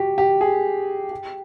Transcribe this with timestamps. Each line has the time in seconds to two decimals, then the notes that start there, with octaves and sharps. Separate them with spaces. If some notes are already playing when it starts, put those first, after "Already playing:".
Already playing: F#4 G4
0.18 G4
0.41 G#4
1.11 G4